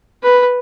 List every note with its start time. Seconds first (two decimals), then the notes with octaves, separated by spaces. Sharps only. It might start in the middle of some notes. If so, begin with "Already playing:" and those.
0.23 B4